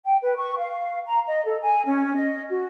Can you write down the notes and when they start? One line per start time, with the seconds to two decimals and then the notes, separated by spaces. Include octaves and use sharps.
0.05 G5
0.23 B4
0.37 C#6
0.58 F5
1.06 A#5
1.27 D#5
1.45 A4
1.62 G#5
1.86 C#4
2.15 D#5
2.50 F#4